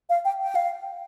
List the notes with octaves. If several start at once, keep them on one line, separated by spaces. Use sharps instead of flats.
F5
G5
G5
F5